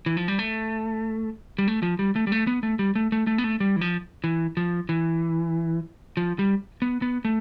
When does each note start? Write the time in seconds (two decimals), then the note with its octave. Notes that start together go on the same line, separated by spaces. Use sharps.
0.06 E3
0.17 F3
0.28 G3
0.39 A3
1.58 G3
1.68 A3
1.83 F3
1.99 G3
2.16 A3
2.27 G3
2.32 A3
2.47 B3
2.63 A3
2.79 G3
2.95 A3
3.12 A3
3.27 A3
3.38 B3
3.44 A3
3.60 G3
3.76 E3
3.81 F3
4.24 E3
4.57 F3
4.89 E3
6.17 F3
6.39 G3
6.82 B3
7.02 B3
7.25 A3